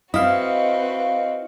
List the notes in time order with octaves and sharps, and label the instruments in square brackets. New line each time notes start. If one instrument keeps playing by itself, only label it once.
[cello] C4 [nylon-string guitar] E4 [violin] F#4 B4 [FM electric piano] D#5 F5